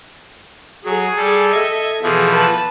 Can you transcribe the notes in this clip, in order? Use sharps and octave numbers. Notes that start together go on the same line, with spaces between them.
F#3 G#4
G3 A4
A4 D#5 E5 G#6
B2 E3 F3 G#4
B4 A5